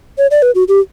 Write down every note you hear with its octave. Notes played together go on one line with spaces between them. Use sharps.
C#5
D5
B4
F#4
G4